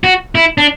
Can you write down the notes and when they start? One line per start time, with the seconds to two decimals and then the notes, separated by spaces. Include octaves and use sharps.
0.04 F#4
0.35 E4
0.58 D4